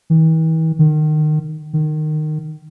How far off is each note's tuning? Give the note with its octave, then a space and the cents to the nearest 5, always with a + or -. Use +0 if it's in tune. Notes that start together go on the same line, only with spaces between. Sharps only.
E3 -45
D#3 -25
D#3 -20